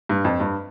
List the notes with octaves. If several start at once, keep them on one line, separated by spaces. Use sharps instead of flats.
G2
F2
G2